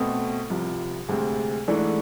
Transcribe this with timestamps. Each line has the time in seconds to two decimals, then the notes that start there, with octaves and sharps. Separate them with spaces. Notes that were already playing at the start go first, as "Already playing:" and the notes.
Already playing: B2 A3 C4
0.50 C2 C3 F3
1.08 D2 C3 G#3 C4
1.68 G#2 E3 A3 D4